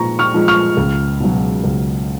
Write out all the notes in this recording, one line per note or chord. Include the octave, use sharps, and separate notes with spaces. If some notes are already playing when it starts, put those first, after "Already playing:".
Already playing: A#2 F3 G#3 A#5 C#6
C#6 F6
F3 G#3
C#6 F6
C#2
B2 F#3
C#2